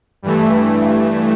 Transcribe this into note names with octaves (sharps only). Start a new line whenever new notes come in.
G2 E3 A3